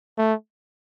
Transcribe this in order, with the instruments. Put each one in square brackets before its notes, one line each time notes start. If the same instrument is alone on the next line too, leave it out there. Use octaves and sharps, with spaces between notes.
[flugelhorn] A3